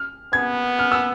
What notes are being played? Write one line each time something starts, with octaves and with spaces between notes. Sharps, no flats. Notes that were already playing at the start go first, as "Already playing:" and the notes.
Already playing: F6
B3 G#6
F6
E6